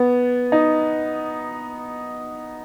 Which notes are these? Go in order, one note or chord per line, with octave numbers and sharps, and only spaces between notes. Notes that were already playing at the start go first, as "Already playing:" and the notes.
Already playing: B3
D#4